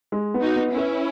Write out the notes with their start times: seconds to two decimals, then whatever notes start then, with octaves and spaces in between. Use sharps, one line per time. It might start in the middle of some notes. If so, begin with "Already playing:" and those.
0.12 G#3
0.34 B3
0.41 D#4 F#4
0.56 B3
0.71 C#4 E4
0.78 B4